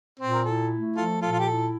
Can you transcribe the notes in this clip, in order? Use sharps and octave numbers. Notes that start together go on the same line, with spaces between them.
A#2 C4
A#4
E4 A4
A3
F3 F4 A4
A#2 F4 A4
F4
G4
E4 A4